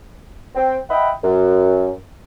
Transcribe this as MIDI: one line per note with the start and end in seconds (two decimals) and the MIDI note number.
0.55 0.76 60
0.55 0.76 79
0.90 1.11 75
0.90 1.11 76
0.90 1.11 78
0.90 1.11 79
0.90 1.11 83
1.23 1.90 42